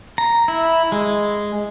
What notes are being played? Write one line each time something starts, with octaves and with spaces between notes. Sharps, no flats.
A#5
E4
G#3